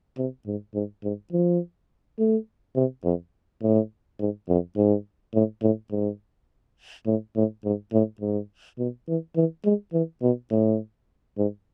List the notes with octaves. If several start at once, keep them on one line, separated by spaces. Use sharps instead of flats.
C3
G#2
G#2
G#2
F3
A3
C3
F2
A2
G#2
F2
G#2
A2
A2
G#2
A2
A2
G#2
A2
G#2
B2
E3
E3
G#3
E3
B2
A2
G#2